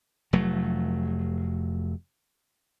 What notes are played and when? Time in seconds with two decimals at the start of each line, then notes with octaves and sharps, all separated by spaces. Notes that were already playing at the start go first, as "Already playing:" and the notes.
0.33 F1 F#3 A3